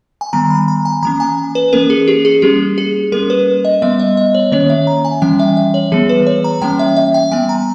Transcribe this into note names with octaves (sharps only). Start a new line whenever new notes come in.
G#5
D#3 G3 B3 A#5
B5
A#5
G#5
E3 A#3 C#4 A#5
G#5
B4
E3 A#3 C#4 A#4
G#4
G4
G#4
G3 A#3 C#4 G4
G#4
G3 A#3 C#4 A#4
B4
D#5
G3 B3 E5
D#5
D#5
C#5
D#3 A#3 C#4 C#5
E5
A#5
G#5
E3 G3 C#4 G5
E5
E5
C#5
E3 G3 B3 G#4
B4
C#5
A#5
E3 G3 A#3 C#4 G5
E5
E5
G5
G3 B3 G#5
A#5